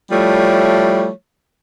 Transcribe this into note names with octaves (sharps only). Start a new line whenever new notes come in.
F3 G3 A3 E4 C#5